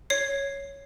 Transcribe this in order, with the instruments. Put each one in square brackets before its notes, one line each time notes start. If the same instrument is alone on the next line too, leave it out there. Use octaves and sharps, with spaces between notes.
[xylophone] C#5 C7